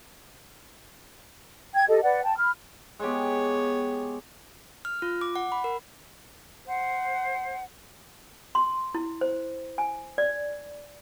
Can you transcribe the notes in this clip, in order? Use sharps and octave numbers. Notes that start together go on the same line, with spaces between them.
G5 G#6
G4 A4 D#5
B4 D5 F#5
G5 A5
B5 F6
G#3 B3 G4 C#5
F6
F4
D6
F#5
B5
A#4
C5 F#5
C6
E4
C5
G#5
D5